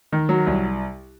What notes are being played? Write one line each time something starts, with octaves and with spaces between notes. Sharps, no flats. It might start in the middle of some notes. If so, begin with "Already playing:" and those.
D#3
F#3
C2